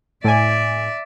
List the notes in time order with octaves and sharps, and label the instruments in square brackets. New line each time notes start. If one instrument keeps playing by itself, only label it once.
[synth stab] A2 G#5 [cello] D5 E5